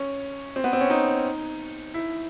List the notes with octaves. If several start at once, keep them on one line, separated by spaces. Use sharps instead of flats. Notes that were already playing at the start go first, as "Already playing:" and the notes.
Already playing: C#4
C4
B3
C4
C#4
D#4
E4